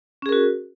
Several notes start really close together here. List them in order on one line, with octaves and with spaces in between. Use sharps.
C#4 G#4 A#4 F#4